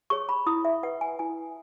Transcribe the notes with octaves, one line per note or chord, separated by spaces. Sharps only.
G#4 C#5 C#6
B5
E4 D#6
E5
B4 F#5
G#5
E4 G#5